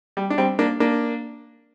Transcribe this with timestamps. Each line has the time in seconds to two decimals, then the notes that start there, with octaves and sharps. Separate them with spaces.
0.17 G3
0.30 D4
0.38 G3 C4
0.59 A#3 D4
0.80 A#3 D4